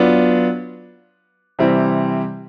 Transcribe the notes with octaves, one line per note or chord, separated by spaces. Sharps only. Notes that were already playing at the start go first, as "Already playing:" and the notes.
Already playing: F#3 B3 D4 F4
C3 E3 G3 C4 E4